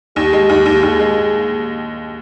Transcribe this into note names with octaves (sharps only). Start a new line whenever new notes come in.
D#2 G4
G#3
D#2
D#2
D#2 G#4
G#3